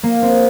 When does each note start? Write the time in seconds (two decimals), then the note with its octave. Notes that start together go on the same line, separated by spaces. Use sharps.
0.03 A#3
0.22 C4